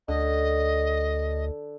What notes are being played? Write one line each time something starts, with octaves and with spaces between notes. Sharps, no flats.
D2 D3 D#5